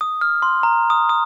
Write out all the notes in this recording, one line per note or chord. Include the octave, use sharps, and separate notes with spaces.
D#6
F6
C6
A#5
D#6
D#6